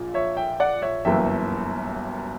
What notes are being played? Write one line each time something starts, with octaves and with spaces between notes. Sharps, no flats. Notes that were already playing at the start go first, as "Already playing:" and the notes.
Already playing: A#1 A#2
C#5 E5
E5 G5
D5 F#5
C#5 E5
G1 F#2 E3 A#3 E5 G5